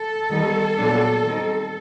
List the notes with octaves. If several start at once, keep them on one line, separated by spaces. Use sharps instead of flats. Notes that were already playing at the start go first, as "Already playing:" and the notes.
Already playing: A4
D#3 G3 B3 D#4
A#2 F#3 B3 D4
D#3 G3 C4 D#4